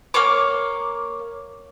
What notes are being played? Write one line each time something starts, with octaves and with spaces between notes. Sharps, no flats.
A#3 C#5 D6